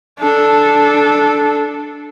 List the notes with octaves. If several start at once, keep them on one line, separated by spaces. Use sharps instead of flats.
D4 A4